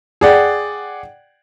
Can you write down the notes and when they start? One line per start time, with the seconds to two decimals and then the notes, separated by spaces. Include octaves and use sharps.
0.21 G#4 D5 F#5 G5